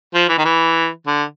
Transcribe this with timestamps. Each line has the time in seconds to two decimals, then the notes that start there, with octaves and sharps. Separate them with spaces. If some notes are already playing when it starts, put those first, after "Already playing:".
0.14 F3
0.29 E3
0.38 D#3
0.45 E3
1.07 D3